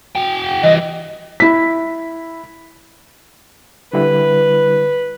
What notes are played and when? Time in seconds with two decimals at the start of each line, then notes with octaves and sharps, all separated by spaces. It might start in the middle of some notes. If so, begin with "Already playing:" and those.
0.15 F#4 G5
0.63 E3 G3 D#5
1.40 E4 B6
3.93 D3 G3 E4 B4